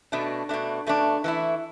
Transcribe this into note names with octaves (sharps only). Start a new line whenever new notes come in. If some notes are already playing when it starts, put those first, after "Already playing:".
B2 A3 D4
B2 A3 D4
B2 A3 D4
E3 A3 E4